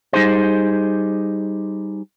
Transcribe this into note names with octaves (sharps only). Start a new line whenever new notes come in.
G3 D#4 G#4 C5